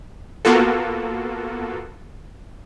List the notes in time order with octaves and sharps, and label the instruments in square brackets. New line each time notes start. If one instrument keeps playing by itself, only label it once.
[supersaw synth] A#3 B3 F4 F#4 A4